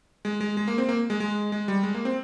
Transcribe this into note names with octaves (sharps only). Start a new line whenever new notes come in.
G#3
G#3
G#3
A#3
C4
A#3
G#3
G#3
G#3
G3
G#3
A#3
C4